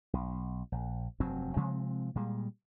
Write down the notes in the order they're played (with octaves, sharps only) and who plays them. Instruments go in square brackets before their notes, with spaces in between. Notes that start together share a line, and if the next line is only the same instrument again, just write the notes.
[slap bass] B1
A#1
F1 G2 F#3 C4
C3 F3 G#3 C4
A#2 G3 G#3